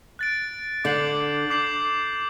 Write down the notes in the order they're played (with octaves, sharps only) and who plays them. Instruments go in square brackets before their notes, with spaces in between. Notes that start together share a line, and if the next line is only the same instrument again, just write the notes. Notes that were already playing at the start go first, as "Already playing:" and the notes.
[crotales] F#6 A6 D7
[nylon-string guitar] D3 [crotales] D6 G6 C7 F#7
[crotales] D6 G6 C7 F#7